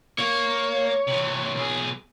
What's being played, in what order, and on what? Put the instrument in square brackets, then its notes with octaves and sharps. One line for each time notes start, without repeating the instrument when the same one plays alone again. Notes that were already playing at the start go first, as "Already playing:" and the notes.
[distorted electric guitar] A#3 [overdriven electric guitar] C#5
[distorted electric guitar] C3 E3
B1 G#4